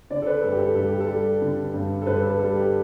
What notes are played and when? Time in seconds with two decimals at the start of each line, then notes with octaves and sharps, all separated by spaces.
0.10 D3 D5
0.22 A4
0.27 B4
0.43 G2 A4
0.52 G4
0.59 A4
0.75 G2 A4
0.88 G4
1.00 A4
1.08 G3
1.42 D3
1.74 G2
2.02 A4
2.06 G2 B4
2.23 A4
2.38 G3 A4
2.55 G4